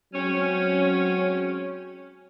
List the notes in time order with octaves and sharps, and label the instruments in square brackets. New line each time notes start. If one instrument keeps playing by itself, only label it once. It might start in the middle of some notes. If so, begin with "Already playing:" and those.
[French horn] F#3 [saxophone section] G#3 C4 C#4